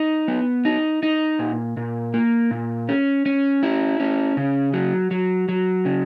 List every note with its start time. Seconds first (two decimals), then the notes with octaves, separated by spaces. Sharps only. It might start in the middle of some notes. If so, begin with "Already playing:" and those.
Already playing: D#4
0.28 B3
0.65 D#4
1.03 D#4
1.39 A#2
1.77 A#2
2.14 A#3
2.51 A#2
2.89 C#4
3.26 C#4
3.63 E4
4.00 C#4
4.37 C#3
4.74 F#3
5.11 F#3
5.49 F#3
5.85 C#3